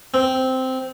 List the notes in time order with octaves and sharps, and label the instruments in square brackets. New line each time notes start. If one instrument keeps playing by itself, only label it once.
[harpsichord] C4